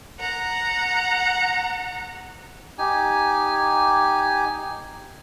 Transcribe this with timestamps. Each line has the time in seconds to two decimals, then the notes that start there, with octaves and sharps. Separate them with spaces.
0.19 F#5 A#5
2.78 D#4 G4 G#5